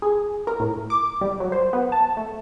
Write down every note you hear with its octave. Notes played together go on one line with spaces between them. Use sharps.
G#4
A#4
A2
D6
G3
F#3
C5
B3
A5
A3